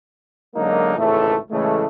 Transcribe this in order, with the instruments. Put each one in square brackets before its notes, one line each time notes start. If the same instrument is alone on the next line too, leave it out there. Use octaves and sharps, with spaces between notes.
[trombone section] F#2 D3 F#3 G#3 A#3 D#4
G#1 C#2 A2 E3 A3
A2 C#3 E3 G#3 A3